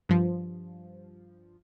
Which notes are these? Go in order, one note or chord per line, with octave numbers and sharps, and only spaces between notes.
G2 F3